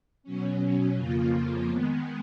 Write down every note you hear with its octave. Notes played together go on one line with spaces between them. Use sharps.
B2 F#3 C#4
F2 C#3 F3 A#3 F4
D#3 G#3 B3